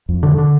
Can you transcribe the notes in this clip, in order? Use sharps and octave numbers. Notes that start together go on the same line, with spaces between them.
F2
D3
D3